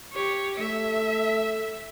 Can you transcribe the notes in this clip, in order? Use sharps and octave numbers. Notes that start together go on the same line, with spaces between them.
G4 C#5
A3 E5